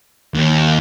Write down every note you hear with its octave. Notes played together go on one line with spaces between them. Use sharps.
D#2